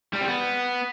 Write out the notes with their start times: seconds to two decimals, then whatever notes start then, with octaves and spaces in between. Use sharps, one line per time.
0.13 G3
0.21 C4
0.28 B3